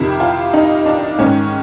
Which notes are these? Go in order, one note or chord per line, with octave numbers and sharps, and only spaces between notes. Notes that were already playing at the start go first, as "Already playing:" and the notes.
Already playing: F2 C3 D#3 E4
F4
D#4
D4
G#2 D#3 C#4